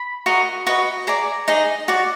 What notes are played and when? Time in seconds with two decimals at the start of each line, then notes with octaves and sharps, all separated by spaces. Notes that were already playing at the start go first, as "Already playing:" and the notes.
Already playing: B5
0.26 F#4 A#4 D#5
0.67 F#4 B4 D#5
1.07 G#4 D5 A#5
1.48 D#4 G#4 D#5
1.88 F#4 D5